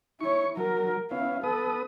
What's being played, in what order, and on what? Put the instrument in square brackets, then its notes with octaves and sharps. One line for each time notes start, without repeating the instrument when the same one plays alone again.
[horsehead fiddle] E4 C#5 [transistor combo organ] C#6
[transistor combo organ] F#3 [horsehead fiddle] A#4
[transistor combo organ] B3 C#4 E4 [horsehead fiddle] F5
[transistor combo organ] B3 B4 D#6 [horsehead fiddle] A4